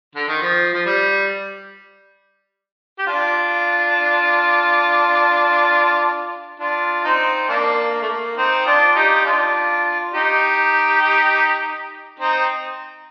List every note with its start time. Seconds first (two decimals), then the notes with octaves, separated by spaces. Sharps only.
0.15 D3
0.28 D#3
0.42 F3
0.74 F3
0.86 G3
2.99 G4
3.07 D4 F4
6.60 D4 F4
7.04 C4 D#4
7.48 A#3 D4
7.92 A#3
8.02 A3
8.09 A#3
8.37 C4 D#4
8.66 D4 F4
8.95 D#4 G4
9.25 D4 F4
10.14 D#4 G4
12.19 C4 D#4